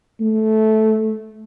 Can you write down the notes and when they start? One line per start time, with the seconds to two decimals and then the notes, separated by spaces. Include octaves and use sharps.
0.20 A3